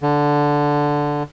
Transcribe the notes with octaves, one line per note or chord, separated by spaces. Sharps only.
D3